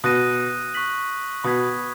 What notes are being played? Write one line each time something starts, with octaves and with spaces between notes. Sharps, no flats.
B2 D#6 F#6 A#6 D#7
C#6 F#6 B6 F#7
B2 B5 D#6 G#6 B6